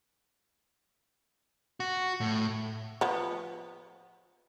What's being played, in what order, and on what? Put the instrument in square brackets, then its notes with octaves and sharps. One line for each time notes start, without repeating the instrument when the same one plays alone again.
[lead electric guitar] F#4
A2
[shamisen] F3 B3